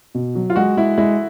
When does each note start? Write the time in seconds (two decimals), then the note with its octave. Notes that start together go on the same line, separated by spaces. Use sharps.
0.15 B2
0.35 F#3
0.50 F4
0.56 G#3 F#4
0.77 G#3 E4
0.98 G#3 E4